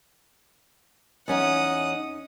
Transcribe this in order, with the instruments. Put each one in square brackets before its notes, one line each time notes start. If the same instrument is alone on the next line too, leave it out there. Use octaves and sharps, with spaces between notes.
[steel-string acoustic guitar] E2 C#4 D#4 [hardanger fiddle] F#5 D#6